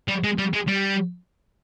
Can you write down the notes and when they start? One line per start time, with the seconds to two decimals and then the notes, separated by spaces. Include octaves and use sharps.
0.08 G3
0.24 G#3
0.39 G3
0.53 G#3
0.67 G3